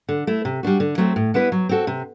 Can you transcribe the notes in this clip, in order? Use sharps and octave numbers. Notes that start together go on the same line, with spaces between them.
D3
A3 E4
C3
G3 D4 F#4
D3
F#3 A3 C4
A2
G3 B3 E4 B4
F#3
C4 F#4 A4
C3